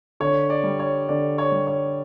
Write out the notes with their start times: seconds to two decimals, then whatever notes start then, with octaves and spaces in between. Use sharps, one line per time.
0.20 D3 C#5
0.50 D5
0.64 G3
0.79 C#5
1.09 D3 D5
1.38 C#5
1.52 G3
1.67 C#5